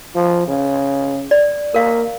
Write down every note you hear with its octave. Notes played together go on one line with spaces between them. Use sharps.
F3
C#3
D5
A#3 A#4 F5